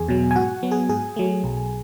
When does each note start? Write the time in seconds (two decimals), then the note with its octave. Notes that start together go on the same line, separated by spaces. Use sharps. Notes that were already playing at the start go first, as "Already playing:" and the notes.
Already playing: E2 G#4 G#5
0.08 B2 F#3
0.31 G#5
0.35 G#2 F#4 F#5
0.63 F#3 B3
0.71 G#4 G#5
0.89 G#2 G#4 G#5
1.16 F#3 A3
1.44 B1